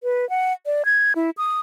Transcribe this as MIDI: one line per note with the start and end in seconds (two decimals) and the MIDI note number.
0.03 0.28 71
0.30 0.53 78
0.66 0.85 74
0.85 1.13 92
1.16 1.30 64
1.37 1.60 87